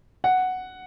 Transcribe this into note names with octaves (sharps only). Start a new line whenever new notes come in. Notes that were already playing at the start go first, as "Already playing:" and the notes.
F#5